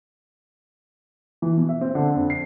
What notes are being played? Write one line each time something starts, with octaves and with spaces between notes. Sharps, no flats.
E3
B2
E5
C4
D3
F2
C7